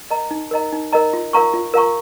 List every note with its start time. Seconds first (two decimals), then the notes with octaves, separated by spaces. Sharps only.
0.10 A#4 D#5 A#5
0.31 D#4
0.51 A#4 D#5 A#5
0.72 D#4
0.92 A#4 D#5 A#5
1.13 F4
1.33 A#4 F5 A#5 C#6
1.54 F4
1.74 A#4 F5 A#5 C#6